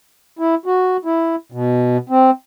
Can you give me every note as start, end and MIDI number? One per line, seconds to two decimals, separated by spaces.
0.39 0.55 64
0.66 0.97 66
1.05 1.36 64
1.52 1.97 47
2.10 2.30 60